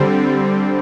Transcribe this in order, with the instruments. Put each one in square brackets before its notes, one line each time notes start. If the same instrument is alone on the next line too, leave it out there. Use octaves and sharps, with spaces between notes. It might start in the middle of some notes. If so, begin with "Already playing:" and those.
Already playing: [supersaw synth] D3 G3 C4